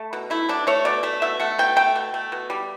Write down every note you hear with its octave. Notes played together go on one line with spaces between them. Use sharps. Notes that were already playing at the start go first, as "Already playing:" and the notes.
Already playing: A3
B2
A3 E4
B2 D4
A3 C#5
B2 D5
A3 E5
B2 E5
A3 F#5
B2 G5
A3 G5
B2
A3
B2
G3